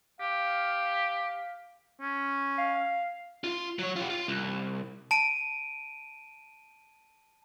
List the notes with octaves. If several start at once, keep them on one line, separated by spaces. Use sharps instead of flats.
G4 F5
C#4
F5
F4
F#3 C#5
F4 G4
F4
C2
A5 D7 D#7